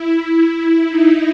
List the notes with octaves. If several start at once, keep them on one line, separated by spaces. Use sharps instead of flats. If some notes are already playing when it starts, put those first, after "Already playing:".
Already playing: E4
D#4